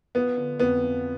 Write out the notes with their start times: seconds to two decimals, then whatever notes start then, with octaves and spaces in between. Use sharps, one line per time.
0.15 F3 B3
0.37 D3
0.59 F2 B3
0.82 F3